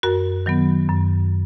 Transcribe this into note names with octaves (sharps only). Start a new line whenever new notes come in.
F#2 F#4 A#4
D#3 F#3 B3
F#2